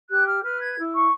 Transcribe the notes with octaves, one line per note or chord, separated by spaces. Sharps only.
G4 F#6
F6
B4 F6
G#6
E4
C#6